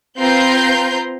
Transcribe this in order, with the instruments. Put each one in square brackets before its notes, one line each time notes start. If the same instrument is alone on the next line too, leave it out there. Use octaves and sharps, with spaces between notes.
[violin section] C4 F4 B4 A#5 C6 G6